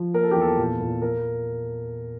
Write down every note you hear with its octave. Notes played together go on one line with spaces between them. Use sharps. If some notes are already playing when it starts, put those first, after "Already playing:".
Already playing: F3
A#3 A#4
A4
G4
E2 A4
A#2
A#2
A#4